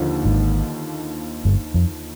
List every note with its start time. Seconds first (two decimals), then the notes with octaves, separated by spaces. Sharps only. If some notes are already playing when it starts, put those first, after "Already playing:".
Already playing: D#2 D3 F3
0.25 G#1 G#2
1.45 G1 G2
1.74 F2